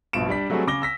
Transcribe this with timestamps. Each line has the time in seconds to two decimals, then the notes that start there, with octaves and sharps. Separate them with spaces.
0.13 A#1 G2 B2 F4 D7 E7
0.29 G3 D4 B6
0.50 F#3 G3 A3 C4 F#4 G#4
0.67 C#3 D6 A#6 G7
0.82 E6 A#6 B6